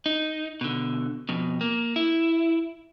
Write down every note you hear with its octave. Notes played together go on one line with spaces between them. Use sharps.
D#4
B2 D3
F2 B2
A#3
E4